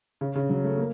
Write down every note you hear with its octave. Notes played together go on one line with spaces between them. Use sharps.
C#3
C#3
F#3
A3
A#3